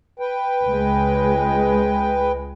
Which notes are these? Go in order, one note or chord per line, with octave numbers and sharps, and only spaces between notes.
B4 G5
C#2 G#3